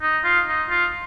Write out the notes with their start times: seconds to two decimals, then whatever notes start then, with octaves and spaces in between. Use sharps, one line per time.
0.02 D#4
0.24 F4
0.48 D#4
0.70 F4